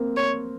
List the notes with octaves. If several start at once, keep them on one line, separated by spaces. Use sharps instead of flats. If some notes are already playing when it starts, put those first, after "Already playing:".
Already playing: A#3 C4
C#5